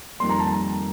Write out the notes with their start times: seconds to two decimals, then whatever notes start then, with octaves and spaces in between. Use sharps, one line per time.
0.20 F2 D#3 G3 A#3 C6
0.30 A#5
0.40 A5
0.50 A#5